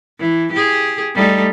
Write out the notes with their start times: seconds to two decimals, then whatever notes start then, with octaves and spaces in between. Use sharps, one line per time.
0.19 E3
0.52 G4 G#4
1.14 G3 A3 D#4